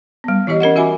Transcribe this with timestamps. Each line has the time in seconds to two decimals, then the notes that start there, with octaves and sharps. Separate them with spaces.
0.24 G3 B3
0.47 E3 E4 G4 C#5 D#5
0.60 C#4 A#4 D#5 F#5
0.76 F#4 E5 G#5 B5 D6